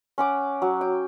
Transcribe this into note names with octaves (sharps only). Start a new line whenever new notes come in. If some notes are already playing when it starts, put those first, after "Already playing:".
C#4 F#5 D6
F#3
G5